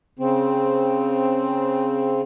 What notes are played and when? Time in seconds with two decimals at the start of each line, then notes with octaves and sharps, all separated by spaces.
0.19 C#3 C4